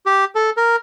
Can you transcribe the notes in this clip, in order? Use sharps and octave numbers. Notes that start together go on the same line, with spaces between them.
G4
A4
A#4